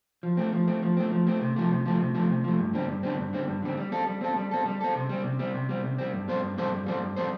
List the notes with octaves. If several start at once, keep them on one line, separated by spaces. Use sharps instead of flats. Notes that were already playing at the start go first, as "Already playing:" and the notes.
F3
A3 C4
F3
A3 C4
F3
A3 C4
F3
A3 C4
C3
F3 A3
C3
F3 A3
C3
F3 A3
C3
F3 A3
G2
D3 G3 C4
G2
D3 G3 C4
G2
D3 G3 C4
G2
D3 G3 C4
G3
C4 A4
G3
C4 A4
G3
C4 A4
G3
C4 A4
C3
G3 C4
C3
G3 C4
C3
G3 C4
C3
G3 C4
G2
G3 C4 A4 C5
G2
G3 C4 A4 C5
G2
G3 C4 A4 C5
G2
G3 C4 A4 C5